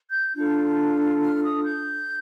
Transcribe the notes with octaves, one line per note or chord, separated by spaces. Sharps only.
G6
D4 F4 A4
F6
D#6
G6